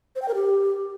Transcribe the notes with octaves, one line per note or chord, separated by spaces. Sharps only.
C5
G5
A#4
G4